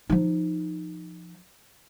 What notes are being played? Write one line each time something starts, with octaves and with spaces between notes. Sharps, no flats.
F3 D#4